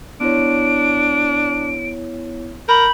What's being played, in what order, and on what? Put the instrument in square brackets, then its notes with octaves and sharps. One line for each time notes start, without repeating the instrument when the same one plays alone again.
[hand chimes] B3 E4 C#5 [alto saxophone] D4 [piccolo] D7
[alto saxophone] A#4 [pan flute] B5 [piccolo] G6